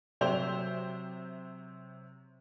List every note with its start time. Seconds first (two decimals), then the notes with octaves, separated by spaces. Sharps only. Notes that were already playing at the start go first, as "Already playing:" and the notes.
0.21 C3 F#3 C5 E5 G5 F7